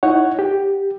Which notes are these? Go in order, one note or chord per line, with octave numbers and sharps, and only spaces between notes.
D#4 E4 C#5 F#5
G4